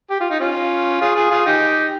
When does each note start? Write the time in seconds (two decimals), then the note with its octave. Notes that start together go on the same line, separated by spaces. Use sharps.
0.10 G4
0.20 F4
0.30 D#4
0.40 C#4 F4
1.01 F4 G#4
1.16 F4 G#4
1.31 F4 G#4
1.46 D#4 G4